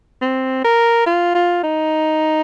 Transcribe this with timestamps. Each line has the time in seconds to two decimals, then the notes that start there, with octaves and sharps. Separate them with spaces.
0.21 C4
0.64 A#4
1.06 F4
1.35 F4
1.63 D#4